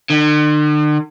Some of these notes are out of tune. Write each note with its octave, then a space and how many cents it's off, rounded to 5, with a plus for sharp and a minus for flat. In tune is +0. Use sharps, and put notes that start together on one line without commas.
D3 +45